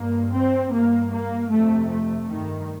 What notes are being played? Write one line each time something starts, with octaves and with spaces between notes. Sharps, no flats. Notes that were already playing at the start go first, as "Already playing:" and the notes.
Already playing: G2 A#3
C4
G2 A#3
A#3
F2 C3 A3
A3
G2 D#3